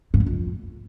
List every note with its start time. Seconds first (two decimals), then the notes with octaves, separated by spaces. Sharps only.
0.14 G#2
0.20 D3
0.26 F2